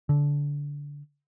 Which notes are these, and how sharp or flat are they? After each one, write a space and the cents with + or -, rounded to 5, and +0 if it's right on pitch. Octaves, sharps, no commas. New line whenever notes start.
D3 -20